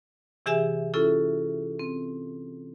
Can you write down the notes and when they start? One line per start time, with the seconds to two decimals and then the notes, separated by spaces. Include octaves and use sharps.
0.46 C3 E3 G4 G#4 E5 G#5
0.94 C#4 E4 F4 A4
1.79 C4